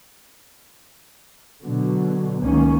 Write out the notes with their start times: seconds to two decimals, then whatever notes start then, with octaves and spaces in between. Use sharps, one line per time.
1.62 B2 D3 F#3
2.40 C#2 D#3 A#3 C#4